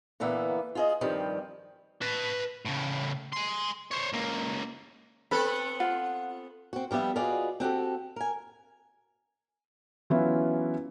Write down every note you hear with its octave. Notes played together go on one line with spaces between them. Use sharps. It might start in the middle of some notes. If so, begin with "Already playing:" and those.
A#2 D3 E3 A#3 B3
F4 G#4 D#5
G2 D#3 F3 G3 C4
B4 A5
A2 C#3
G#5 C6
C5 C#5
C#2 A#3
B3 C4 A4 B4
F4 F#5
C4 F#4
F3 G3 B3 G4 E5
F4 F#4 G#4 B4 D5 D#5
C4 F#4 G4 A4
A#4 G#5
E3 F#3 B3 C#4 E4 F4